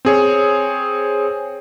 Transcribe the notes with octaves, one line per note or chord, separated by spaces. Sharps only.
C4 G#4 C#5